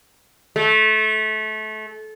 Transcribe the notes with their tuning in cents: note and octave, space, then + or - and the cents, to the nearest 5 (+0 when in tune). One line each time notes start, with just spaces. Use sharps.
A3 -25